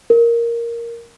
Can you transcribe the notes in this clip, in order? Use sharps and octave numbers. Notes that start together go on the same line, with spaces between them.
A#4